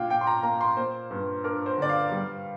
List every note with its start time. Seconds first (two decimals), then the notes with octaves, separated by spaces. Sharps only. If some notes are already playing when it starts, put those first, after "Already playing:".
Already playing: A#2 D4 F5 G5
0.10 A#2 G5
0.21 C6
0.27 A#5
0.43 A#3 A#5
0.61 C6
0.77 A#3 C5
1.11 G2
1.44 D4 A#4
1.66 C5
1.78 D3 D5
1.89 F5
2.11 G3